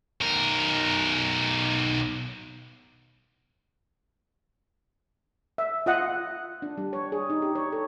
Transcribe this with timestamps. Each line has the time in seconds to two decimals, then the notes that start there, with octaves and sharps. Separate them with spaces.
0.21 B1 A#4
5.58 E5
5.86 F4 D#5 F#5
6.62 D4
6.78 G3
6.93 C#5
7.12 G#4
7.30 D#4
7.42 G4
7.55 C#5
7.72 A4